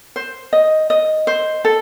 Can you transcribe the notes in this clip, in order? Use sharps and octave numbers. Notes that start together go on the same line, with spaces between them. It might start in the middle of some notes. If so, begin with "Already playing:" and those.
C5
D#5
D#5
C5
A4